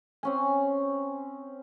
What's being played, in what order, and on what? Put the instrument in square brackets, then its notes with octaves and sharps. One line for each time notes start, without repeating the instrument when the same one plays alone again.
[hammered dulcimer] C4 C#4 G#5